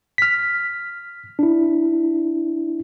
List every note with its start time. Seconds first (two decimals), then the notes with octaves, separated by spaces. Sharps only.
0.18 F6 B6
1.39 D4 E4